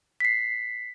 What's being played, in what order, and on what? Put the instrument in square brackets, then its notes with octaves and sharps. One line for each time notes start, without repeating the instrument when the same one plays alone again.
[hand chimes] B6 C7